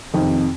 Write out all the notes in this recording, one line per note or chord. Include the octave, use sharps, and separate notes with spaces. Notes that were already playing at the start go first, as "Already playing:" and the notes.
F2 C3 D#3